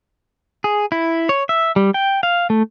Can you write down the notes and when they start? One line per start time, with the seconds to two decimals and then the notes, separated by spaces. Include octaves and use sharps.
0.64 G#4
0.92 E4
1.29 C#5
1.49 E5
1.76 G3
1.94 G5
2.23 F5
2.50 A3